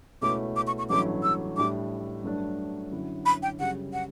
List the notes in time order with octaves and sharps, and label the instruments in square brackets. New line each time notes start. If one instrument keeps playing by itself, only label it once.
[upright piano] C#2 B2 A3 C#4 E4 [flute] D6
[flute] D6
C#6
C#6
[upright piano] A1 G2 F#3 A3 E4 [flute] D6
[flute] E6
[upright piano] A2 G3 D4 [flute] D6
[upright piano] G2 F#3 A3 D4
F#2 D3 F#3 C#4 E4
[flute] B5
G5
[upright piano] F#2 C#3 G3 [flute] F#5
[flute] F#5